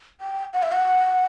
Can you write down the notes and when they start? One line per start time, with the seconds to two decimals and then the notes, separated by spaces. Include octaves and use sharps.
0.21 G5
0.53 F#5
0.63 E5
0.72 F#5